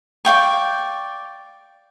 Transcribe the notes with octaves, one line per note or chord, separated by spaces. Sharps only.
D5 F5 G5 C#6